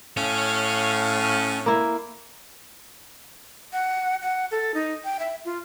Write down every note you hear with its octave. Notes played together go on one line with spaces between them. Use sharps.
A2 C#4 F5
A#3 E4
F#5
F#5
A4
D#4
G5
E5
F4